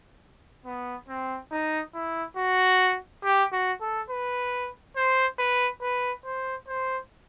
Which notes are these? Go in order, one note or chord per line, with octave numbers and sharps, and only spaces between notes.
B3
C4
D#4
E4
F#4
G4
F#4
A4
B4
C5
B4
B4
C5
C5